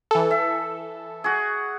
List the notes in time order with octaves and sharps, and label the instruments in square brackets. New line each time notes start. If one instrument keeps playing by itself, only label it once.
[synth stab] E3 A4
[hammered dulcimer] E5
F#4 G#4